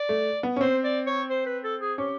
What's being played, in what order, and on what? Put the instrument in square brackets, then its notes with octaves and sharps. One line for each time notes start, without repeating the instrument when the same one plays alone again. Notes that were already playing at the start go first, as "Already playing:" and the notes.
Already playing: [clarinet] D5
[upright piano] A3
B3
C#4
[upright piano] C4 [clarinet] C5
[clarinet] D5
C#5
C5
B4
A4
G#4
[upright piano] C#4 [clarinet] G4